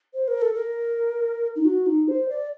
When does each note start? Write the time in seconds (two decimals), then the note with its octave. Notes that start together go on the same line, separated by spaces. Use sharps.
0.14 C5
0.28 A#4
0.41 A4
0.54 A#4
1.56 D#4
1.65 F#4
1.86 D#4
2.08 C5
2.29 D5